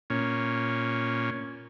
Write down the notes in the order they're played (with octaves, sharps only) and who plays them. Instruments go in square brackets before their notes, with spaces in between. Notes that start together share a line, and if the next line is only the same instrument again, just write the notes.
[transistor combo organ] A#2 C#4